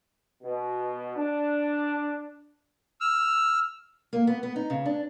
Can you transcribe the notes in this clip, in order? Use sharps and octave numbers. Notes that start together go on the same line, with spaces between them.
B2
D4
E6 F6
A#3
B3
B3
D#4
C#3
D4